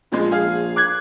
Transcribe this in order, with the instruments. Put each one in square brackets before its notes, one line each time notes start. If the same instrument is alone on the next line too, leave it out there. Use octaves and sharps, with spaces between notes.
[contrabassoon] A#1 [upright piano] A#2 F3 G#3
[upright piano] G#4 F5
D6 F#6 G#6